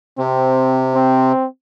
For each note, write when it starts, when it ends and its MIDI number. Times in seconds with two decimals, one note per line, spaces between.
0.18 1.32 48
0.18 0.83 60
0.95 1.46 60